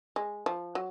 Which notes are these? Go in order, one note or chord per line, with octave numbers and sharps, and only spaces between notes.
G#3
F3
F#3